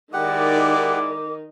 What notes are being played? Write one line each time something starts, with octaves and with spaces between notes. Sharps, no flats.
D#3 G#3 D#4 E4 G4 D5 F#5 D6